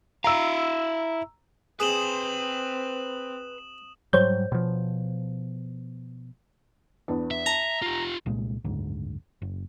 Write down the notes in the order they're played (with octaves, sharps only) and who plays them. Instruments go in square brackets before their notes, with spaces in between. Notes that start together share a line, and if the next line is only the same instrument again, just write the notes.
[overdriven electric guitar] E4 F5 [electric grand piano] A#5 E6
[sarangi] C4 [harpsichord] G#4 [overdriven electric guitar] B4 C6 [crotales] D#6 E7 F#7
[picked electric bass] G#2 F#3 G3 [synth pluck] C5 C#5 G6
[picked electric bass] B2 F3
[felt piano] E2 B3 D4
[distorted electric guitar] E5
[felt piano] A5 [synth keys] A#5
[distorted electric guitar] F4 G4
[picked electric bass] C2 A#2 G#3
F#1 D2 G#2
F#1